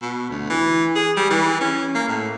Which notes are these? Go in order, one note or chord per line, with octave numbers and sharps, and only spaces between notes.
B2
D2
E3
G#4
G3
E3
C#4
A#3
A2